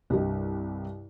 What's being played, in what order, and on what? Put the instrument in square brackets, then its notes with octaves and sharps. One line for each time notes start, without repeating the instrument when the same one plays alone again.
[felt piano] C2 G2 G3 D#5